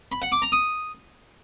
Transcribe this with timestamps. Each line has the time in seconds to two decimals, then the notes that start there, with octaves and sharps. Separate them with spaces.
0.12 B5
0.22 F#5
0.32 D6
0.42 A#5
0.52 D#6